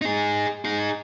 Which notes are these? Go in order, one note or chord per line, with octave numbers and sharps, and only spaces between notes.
D#4 G#4
D#4 G#4